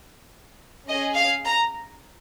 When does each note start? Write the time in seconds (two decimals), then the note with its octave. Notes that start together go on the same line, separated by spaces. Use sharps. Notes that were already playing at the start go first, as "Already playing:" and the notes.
0.88 C#4 G#4 D#5
1.16 F5
1.45 A#5